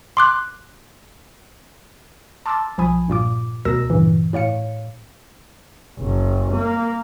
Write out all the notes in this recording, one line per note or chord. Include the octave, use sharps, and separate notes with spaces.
C6 D6 F#6
A5 C6 D6 E6 F6 A6
B1 F3 G#5 B5 D#6
G2 A#2 F4 D6
D2 B2 A#4 E6 A#6
G2 A#2 C#3 E3
A2 C#5 F5 C#7
F#1
A#3